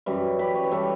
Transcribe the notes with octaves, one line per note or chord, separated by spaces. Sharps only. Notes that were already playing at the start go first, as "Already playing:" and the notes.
F#2 E3 G3
G4 B4
C#5
B4
E3 G3 A4 C#5